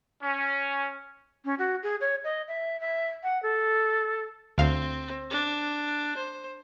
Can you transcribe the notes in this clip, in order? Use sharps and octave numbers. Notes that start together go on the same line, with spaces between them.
C#4
C#4
F#4
G#4
C#5
D#5
E5
E5
F#5
A4
D2 C4 F5
D4
C5